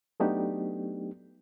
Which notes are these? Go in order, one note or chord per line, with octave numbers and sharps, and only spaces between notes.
F#3 A3 B3 D4 D#4 G4